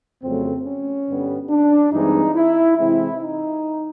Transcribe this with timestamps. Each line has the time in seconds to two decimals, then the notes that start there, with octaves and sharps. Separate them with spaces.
0.22 F2 C#3 F#3 A3 C4
0.65 C#4
1.08 G2 D3 G3 B3
1.50 D4
1.92 G2 E3 G#3 C4 D#4
2.35 E4
2.78 C3 E3 G#3 C4 E4
3.20 D#4